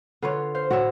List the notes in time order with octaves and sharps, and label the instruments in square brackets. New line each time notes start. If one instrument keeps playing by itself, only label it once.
[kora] D3 B4 C#5 [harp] F4
[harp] C5 F5
[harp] A2 [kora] F#4 C#5 E5